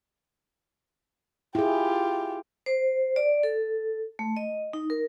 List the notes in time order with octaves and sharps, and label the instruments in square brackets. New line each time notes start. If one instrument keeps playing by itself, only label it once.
[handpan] E4 G#4 [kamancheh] F4 G4
[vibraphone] C5
D5
A4
A3
D#5
D#4
A#4